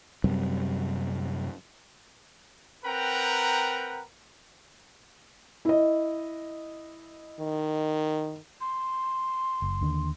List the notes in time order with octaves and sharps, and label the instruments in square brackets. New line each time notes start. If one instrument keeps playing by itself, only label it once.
[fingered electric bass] F#2 C3 G3
[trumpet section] C4 A#4 B4 F#5 G5 A#5
[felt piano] E4 D#5
[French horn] D#3
[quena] C6
[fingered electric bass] F#1
D#2 D3